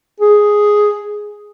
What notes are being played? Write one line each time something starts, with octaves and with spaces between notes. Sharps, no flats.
G#4